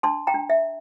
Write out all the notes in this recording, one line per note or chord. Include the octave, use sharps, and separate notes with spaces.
D4 A5 C6
G5 A#5
D4
E5